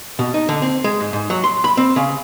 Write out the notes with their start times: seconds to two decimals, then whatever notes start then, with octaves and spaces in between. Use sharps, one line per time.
0.19 B2
0.34 D#4
0.49 D3
0.62 C4
0.84 G#3
1.00 G#2
1.13 G#2
1.30 F#3
1.44 C6
1.64 B5
1.77 C4
1.96 C#3